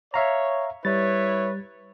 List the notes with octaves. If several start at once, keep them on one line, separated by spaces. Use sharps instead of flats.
C#5 E5 F5 A#5
G3 E4 B4 C#5 A6